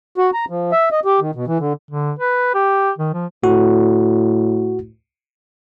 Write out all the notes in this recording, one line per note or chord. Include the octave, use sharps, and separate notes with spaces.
F#4
A#5
F3
E5
D#5
G4
D#3
B2
E3
D3
D3
B4
G4
D#3
F3
A2 F#4